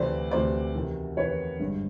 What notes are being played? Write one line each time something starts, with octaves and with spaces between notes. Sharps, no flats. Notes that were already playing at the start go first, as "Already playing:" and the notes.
Already playing: D2 C3 E3 A3 C5 D5
D2 C3 E3 A3 C5 D5
E2 C3 D#3
E2 C3 D#3 B4 C#5
G#1 G2 D3